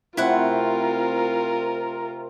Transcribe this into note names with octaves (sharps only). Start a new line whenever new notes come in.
C3 A3 C4 E4 F4 A#4 F#5